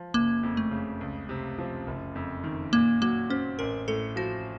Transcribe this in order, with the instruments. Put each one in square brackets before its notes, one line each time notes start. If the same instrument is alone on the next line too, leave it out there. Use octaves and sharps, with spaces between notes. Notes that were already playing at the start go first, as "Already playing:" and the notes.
Already playing: [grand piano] F3
[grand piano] F#1 [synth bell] A#3
[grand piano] F2
[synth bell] A3
[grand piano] C#3
C#2
C3
F3
F#1
F2
D#3
[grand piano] A#2 [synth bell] A#3
[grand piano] F#3 [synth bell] A#3
[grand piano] C4 [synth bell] C#4
[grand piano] A1 [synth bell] A#4
[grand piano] A2 [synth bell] A4
[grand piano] F3 [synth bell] F#4